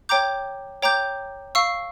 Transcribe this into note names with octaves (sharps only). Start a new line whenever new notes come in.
C#5 G5 A#5 D6 G6
C#5 G5 A#5 D6 G6
F5 C#6 E6